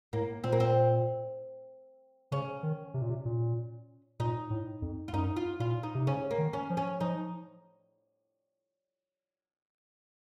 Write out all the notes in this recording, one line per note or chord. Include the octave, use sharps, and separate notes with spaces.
A2 A#3
A#2 C4
A#3
C4
C#3 C#4
D#3
C3
A#2
C3
A#2
A#2 D#4
A2
F2
F4
F#2 D#4
F4
A#2 F4
D#4
C3
C#3 C#4
A#3
D#3
C#4
F3
C#4
F3 D#4